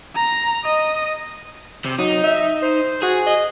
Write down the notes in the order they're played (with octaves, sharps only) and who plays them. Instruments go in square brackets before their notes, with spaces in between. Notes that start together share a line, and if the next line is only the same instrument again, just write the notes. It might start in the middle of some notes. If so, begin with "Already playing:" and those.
[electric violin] A#5
D#5
[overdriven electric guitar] C3
[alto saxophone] F#3 [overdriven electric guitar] D#4
[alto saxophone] E5
C5
[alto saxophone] F#4 [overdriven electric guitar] G#4
[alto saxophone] D#5